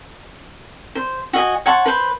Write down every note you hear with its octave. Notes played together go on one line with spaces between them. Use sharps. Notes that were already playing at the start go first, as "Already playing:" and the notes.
C5
F#4 D#5 G#5
C#5 F#5 A5 C6
B4 C5